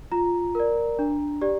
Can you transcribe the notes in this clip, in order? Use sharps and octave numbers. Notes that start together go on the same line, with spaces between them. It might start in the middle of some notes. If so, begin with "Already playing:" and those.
F4 A#5
A#4 D5
D4
G4 D5